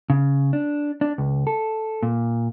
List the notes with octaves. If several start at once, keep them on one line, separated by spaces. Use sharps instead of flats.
C#3
D4
D4
C#2
A4
A#2